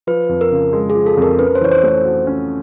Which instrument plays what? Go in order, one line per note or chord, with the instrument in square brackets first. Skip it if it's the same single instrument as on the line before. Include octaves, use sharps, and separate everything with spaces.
[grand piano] F3 [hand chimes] B4
[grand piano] F2
[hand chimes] A#4
[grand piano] C#3
G#3
[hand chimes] G#4
[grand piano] F3
[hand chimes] A4
[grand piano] F2 [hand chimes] A#4
[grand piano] C#4 [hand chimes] B4
[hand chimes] C5
[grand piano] E3 [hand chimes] C#5
[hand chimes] C5
[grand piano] A3 [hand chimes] C5
[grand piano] F#4
C#4